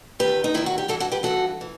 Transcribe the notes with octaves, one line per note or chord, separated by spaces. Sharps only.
E2 D#3 G4 B4
D#4
E2 D#3 E4
F#4
G4
G2 E3 F#4 A4
F#4 A4
G4 B4
G2 E3 F#4 A4
E3